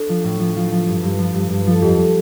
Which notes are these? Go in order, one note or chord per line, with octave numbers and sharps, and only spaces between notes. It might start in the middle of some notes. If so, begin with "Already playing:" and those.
Already playing: D4 A4
F3
A2
F3
F3 F4
F3
G2
G2
F3
G2
G2
F3 A4
F2 G4